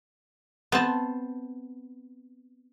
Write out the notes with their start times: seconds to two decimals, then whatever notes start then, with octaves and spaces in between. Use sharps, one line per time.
0.72 B3 C4 A5